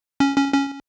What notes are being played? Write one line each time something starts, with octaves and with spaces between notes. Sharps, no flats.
C#4
C#4
C#4